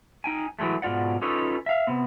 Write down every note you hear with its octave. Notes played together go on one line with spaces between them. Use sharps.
D#4 G5 G#5
E3 F#3 G#3 A3
G#2 B2 F4 D5 F#5
C#4 D#4 F4 A4 B4 C#5
E5 F5
C3 B3 C4